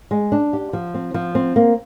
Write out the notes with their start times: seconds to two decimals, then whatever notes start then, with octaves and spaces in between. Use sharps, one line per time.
0.11 G#3
0.32 D4
0.53 G4
0.73 F3
0.94 C4
1.14 F3
1.35 C4
1.56 A#3